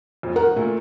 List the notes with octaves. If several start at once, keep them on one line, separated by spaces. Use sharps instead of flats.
F2 A#2
A#4 F#5
A#2 A3